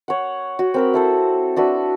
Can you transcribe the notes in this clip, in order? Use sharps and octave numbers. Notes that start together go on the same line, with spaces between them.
C#5 F#5
F#4
C4 A#4 B5
E4 A4 C5
D4 F#4 B4 E5